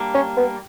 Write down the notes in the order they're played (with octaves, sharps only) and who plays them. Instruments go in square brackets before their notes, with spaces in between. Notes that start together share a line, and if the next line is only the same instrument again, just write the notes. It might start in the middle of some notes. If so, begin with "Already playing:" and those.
Already playing: [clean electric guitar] G3 A#3 D4
[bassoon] C#4
B3